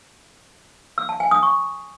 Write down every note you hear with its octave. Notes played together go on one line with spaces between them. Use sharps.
E6
A5
G#5
D#6
C#6